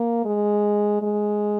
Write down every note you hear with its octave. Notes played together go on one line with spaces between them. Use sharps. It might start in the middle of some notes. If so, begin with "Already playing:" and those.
Already playing: A#3
G#3
G#3